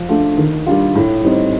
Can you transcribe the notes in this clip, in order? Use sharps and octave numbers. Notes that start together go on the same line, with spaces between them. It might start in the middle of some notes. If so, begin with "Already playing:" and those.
Already playing: F3
A3 D4 F4
D#3
G3 D4 F4
A2
G3 C4 D#4